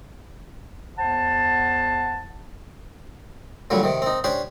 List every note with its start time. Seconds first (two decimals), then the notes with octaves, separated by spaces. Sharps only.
0.98 E2 C5 F#5 A5
3.70 A#2 D3 F#3 G3
3.83 C3 D#3
4.02 C4 D#4
4.24 C#4 D4 G4 C5